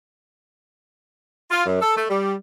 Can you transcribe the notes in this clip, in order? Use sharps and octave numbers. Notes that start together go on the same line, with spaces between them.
F4
F#2
A4
A3
G3